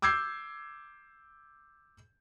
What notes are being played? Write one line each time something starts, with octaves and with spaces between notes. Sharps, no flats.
D6 E6 G6 G#6 C7